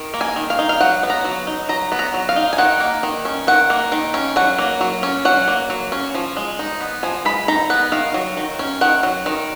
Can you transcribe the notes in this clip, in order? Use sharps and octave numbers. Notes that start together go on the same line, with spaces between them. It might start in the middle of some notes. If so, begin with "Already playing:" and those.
Already playing: D#3
A#3
G#5
D#3
F5
D#4
F5
F#3 F#5
B3
A#5
F#3
D#4
F#3 A#5
B3
A#5
F#3
F5
D#4
G#5
D#3 F#5
A#3
D#3
C#4
D#3 F#5
A#3
D#3
C#4
F#3 F#5
A#3
F#3
C#4
F#3 F#5
A#3
F#3
C#4
F3
G#3
D#4
B3
F3 G#5
G#3 B5
D#4 A#5
B3 F#5
D#3 F5
F#3
D#3
C#4
D#3 F#5
F#3
D#3